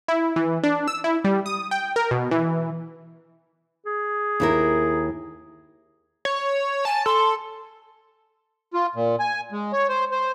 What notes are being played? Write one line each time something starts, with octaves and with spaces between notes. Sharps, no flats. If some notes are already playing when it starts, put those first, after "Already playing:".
E4
E3
D4
E6
E4
G3
D#6
G5
A#4
B2
E3
G#4
D#2 E4 A#4
C#5
G#5 A5
A4 C6
F4
A#2
G#5
G#3
C#5
C5
C5